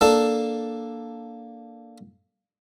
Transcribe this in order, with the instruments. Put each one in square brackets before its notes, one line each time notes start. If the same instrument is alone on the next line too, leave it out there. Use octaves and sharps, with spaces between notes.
[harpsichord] A#3 D4 A4